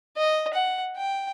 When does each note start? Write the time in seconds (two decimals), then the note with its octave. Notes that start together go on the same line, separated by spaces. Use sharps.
0.17 D#5
0.53 F#5
0.96 G5